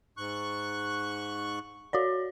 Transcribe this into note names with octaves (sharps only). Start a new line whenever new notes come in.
G#2 C#6 F#6
F#4 C#5 D5